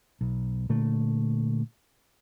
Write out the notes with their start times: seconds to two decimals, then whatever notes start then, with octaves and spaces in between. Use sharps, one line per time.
0.21 B1
0.69 A#2 D3 A3